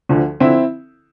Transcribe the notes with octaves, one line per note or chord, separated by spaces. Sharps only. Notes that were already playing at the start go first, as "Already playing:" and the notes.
D2 D3 F3
D3 F3 C4 E4